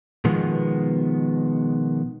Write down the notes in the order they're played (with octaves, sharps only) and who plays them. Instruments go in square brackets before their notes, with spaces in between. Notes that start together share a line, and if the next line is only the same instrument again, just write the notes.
[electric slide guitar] B2 D#3 F3 G#3 B3